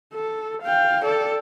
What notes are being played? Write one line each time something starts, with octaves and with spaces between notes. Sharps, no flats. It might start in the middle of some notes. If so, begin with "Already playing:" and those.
A4
F5 G5
A4 D5